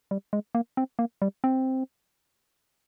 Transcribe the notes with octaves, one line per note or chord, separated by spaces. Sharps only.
G3
G#3
A#3
C4
A#3
G3
C4